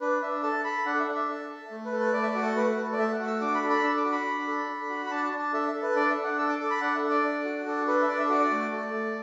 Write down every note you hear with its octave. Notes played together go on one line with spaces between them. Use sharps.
D4 B4
D4 E5
A4 A5
A4 B5
D4 F#5
E5
D4
E5
A4
A4
A3
B4
A4
B4
A3 D5
E5
D5
F#4
A4
A3 B4
B4
A4
D5
A3 E5
F#5
F#4
E6
D4 D6
B5
A4
B5
D4 E6
D6
F#4
B5
D4
A4
D4
F#4
B5
D4 A5
A5
D4
A5
A4 E5
E5
A4
B4
D4 D5
E5
D4
F#5
A4 E6
D6
A4 D6
B5
D4 F#5
E5
A4
D5
D4
F#4
D4 A4
A4 B4
E5
D4 D5
E5
F#4 D5
D5
A3
A4
A3